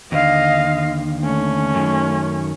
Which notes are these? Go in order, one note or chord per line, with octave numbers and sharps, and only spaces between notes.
D#2 D3 D#5 F5
A3 C#4
F#2 D#3